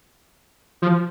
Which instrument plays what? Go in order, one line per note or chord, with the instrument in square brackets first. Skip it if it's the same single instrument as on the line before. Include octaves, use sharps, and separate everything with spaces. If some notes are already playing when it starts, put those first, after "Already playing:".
[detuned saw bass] F3